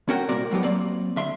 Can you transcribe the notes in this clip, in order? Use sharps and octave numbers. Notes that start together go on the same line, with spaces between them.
C#4 F#4 A#4 F#5 G5
C2 A#2 C4 F#4 A#4 D5
A2 F#3 B3 G4
F#3 A#3 C4 D5
D2 E5 C6